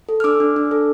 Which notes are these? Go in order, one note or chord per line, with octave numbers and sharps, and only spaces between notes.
A4
F6
D4 D6 E6
D4
D4
A4